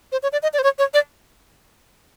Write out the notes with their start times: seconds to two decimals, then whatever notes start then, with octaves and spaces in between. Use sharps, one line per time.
0.12 C5
0.23 C#5
0.32 D5
0.43 D#5
0.53 D5
0.59 C5
0.63 C#5
0.79 C#5
0.94 D5